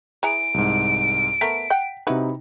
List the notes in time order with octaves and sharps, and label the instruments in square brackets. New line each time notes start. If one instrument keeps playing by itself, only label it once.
[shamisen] E3 G#4 A#5 [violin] D7
[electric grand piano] C2 G#2
[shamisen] A3 B3 A#4 [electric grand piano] B6
[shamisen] F#5 G5
[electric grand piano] C3 D#4 [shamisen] E4 F#4 B4